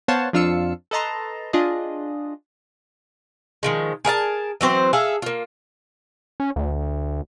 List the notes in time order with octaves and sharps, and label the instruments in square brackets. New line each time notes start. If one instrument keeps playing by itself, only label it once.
[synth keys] B3 C5 C#5 F5 F#5 A5
F2 D4 F4 F5 E6 C#7
A4 B4 D#5 A5 A#5 C6
D4 F4 G#4 D#5
[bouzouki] D#3 F3 G#3
G#4 A#4 E5 A5
E3 F#3 C4 C5
G#4 A4 E5 F5
A#3 F4
[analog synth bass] C#4
D2